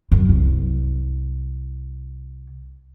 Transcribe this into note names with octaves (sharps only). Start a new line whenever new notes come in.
F#2
C2